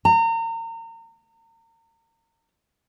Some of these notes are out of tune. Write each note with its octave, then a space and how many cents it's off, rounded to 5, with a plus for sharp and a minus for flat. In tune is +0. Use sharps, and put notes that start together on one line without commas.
A#5 -35